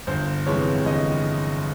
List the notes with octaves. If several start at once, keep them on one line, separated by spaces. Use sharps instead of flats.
G1 C5
F2 C3 E3 G#3 C#5
G1 D#5